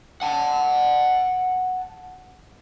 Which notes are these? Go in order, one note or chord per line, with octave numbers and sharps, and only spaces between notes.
F#5 A5